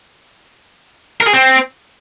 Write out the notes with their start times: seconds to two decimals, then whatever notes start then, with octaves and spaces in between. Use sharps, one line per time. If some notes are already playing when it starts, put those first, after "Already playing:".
1.20 A#4
1.27 G#4
1.33 C4